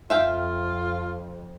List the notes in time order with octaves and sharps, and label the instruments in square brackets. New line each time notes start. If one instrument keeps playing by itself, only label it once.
[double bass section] F2 [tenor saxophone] F4 [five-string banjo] E5 F5 G5